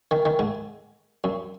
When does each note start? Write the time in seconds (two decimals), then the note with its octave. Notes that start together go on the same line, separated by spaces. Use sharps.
0.11 D#3
0.25 D#3
0.39 G#2
1.24 F#2